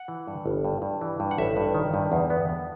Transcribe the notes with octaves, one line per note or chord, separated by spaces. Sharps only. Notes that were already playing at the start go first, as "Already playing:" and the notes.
Already playing: F#5
E3
G2
G1
G2
G2
E3
G2
F#5
A1 E5
G2
D#3
G2
E2
B3
B3